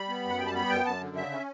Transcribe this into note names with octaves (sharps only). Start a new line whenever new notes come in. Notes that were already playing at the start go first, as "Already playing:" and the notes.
Already playing: G3 B5
B3
F#2
F#5
G3 G5
A5
B3 B5
F#2 G5
F#2 A5
D3
C#3 E5
C#4